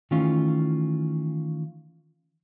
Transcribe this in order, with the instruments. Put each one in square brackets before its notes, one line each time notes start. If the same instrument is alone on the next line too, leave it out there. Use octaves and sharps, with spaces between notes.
[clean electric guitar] D#3 E3 A3 C#4 F4